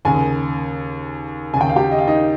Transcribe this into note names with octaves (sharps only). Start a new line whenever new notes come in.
D#2 C#3 G#4 G#5
D#2 C#3 G5 G#5
F5
G4 G5
D#5
F5
D#4 D#5